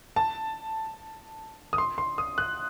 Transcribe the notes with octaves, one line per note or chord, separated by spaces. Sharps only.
A5
D#6
C6
C6
D#6
F#6